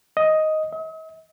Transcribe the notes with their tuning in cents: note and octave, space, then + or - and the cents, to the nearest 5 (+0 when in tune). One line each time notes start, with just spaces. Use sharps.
D#5 +5
D#5 +45